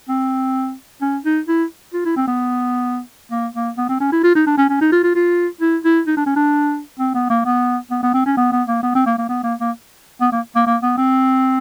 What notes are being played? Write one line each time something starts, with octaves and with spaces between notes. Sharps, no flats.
C4
C#4
D#4
E4
F4
E4
C4
B3
A#3
A#3
B3
C4
C#4
E4
F4
D#4
D4
C#4
C#4
D#4
F4
F4
F4
E4
E4
D#4
D4
C#4
D4
C4
B3
A#3
B3
B3
B3
C4
C#4
B3
B3
A#3
B3
C4
A#3
A#3
B3
A#3
A#3
B3
A#3
A#3
A#3
B3
C4